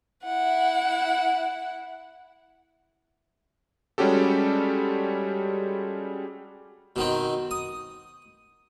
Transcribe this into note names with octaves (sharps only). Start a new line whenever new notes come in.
E4 F#5
G3 G#3 C#4 F#4 G4 A4
B2 D#3 C4
D#6